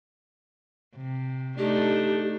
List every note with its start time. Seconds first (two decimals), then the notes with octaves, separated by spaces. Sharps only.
0.96 C3
1.58 A3 D4 D#4 G4